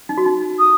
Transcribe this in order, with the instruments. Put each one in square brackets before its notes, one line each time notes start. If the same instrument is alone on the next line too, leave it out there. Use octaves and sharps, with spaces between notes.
[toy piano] D#4
F#4
D#4
[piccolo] D#6